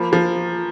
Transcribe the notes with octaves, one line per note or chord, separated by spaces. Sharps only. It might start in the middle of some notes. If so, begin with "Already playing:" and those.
Already playing: F3 A#3 B5
F3